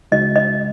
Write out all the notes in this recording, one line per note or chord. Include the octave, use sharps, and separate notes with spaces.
C#2 C#3 G#3 D#4 F#4 D#5
D#5